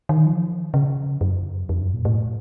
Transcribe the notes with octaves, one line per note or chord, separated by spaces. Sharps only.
D#3
F3
C#3
F#2
F2
F#2
A#2
A2